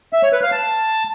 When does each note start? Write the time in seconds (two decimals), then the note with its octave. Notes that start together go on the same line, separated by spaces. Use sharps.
0.13 E5
0.23 C#5
0.32 B4
0.42 F5
0.52 A5